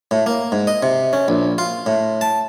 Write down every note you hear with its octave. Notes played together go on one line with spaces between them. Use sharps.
A2
A#3
G#2
D#5
C3
C#4
A#1
F4
A2
A5